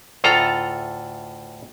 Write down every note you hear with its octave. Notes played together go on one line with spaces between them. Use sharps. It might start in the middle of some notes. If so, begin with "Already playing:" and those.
D2 A2 F4 A4 A#5